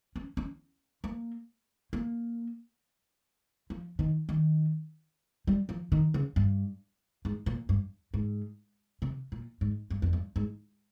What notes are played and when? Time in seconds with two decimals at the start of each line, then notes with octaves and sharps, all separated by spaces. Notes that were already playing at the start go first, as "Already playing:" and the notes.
0.16 C#4
0.37 C#4
1.04 A#3
1.93 A#3
3.70 F3
3.99 D#3
4.29 D#3
5.47 G3
5.69 F3
5.92 D#3
6.14 C#3
6.36 G2
7.25 G#2
7.46 A#2
7.69 G2
8.14 G#2
9.02 C3
9.32 A#2
9.61 G#2
9.90 G2
10.02 F2
10.13 G2
10.36 G#2